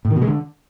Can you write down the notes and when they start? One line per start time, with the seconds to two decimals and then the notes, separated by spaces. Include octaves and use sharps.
0.05 A2
0.10 D#3
0.16 B2
0.22 G#3
0.27 D3